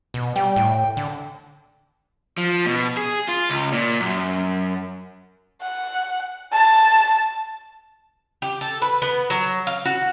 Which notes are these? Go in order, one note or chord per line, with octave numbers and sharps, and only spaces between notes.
B2
G3 G5
A2
D3
F3
B2
G#4
F4
C#2
A#2
F#2
F#5
A5
G4
A4
B4
B3
F#3
F5
F#4